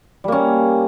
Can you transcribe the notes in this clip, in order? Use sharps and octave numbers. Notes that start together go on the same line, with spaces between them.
G3 A#3 C#4